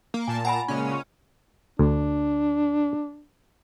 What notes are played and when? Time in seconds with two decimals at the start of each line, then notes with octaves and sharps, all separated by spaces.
0.14 A#3
0.28 A#2 G#5 A5
0.45 F#5 G#5 A#5 B5
0.68 A#2 C#3 G#3 C#4
1.79 D2 D4